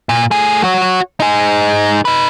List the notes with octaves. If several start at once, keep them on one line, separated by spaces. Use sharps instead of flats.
A#2
A3 G#4
F#4 C#5
D#4 G#4
D#4 B4